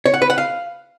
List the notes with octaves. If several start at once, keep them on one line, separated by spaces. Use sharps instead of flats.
C#5
F#5
B4
F#5
F5